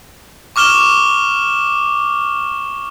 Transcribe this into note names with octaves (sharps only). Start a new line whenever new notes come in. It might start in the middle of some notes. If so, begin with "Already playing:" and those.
C#6 D6 F6 E7 G7